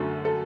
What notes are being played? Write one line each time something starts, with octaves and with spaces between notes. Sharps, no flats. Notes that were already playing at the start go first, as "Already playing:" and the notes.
Already playing: F#2 D3 F#3 A3
A4